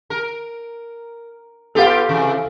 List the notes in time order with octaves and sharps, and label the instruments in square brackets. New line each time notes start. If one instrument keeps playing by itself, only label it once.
[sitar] A#4
[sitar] B3 F4 G4 [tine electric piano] A4 F5
[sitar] C3 E3